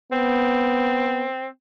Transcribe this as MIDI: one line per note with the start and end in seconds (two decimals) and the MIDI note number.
0.12 1.26 59
0.12 1.47 60